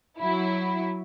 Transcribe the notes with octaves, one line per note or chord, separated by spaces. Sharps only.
F#3 E4